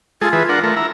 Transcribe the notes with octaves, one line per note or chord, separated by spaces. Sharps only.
G#3 F4 G#4 A4
E3 G#4 B4
D4 A#4 F#5
A3 A#4
E4 A#5